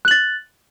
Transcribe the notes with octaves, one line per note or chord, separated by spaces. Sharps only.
F#6 A6 F#7